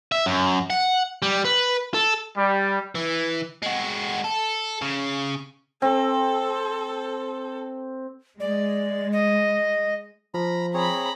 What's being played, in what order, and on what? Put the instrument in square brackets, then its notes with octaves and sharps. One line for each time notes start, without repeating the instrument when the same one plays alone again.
[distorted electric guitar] E5
F#2
F#5
G3
B4
A4
[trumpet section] G3
[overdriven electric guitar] E3
G#3 F#4
A4
C#3
[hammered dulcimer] C4 [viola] A4
[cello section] G#3 [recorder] D5
[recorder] D#5
[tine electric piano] F3 [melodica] A#5 B5
[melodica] C4 G#4 C#5 [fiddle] A#5 B5